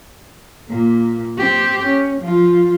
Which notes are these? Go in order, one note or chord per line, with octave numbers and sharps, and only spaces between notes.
A#2 A#3
C4 G4
C#4
F3 F4